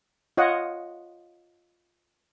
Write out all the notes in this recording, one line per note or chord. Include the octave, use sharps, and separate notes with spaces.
F4 C#5 D#5 F#5